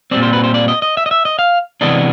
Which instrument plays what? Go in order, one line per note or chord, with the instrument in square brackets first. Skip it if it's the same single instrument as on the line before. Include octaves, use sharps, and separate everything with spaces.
[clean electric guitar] A#2 G3 C4 D5
C5
B4
C5
D5
D#5
D#5
E5
D#5
E5
D#5
F5
C3 E3 G#3 B3 D4 D#5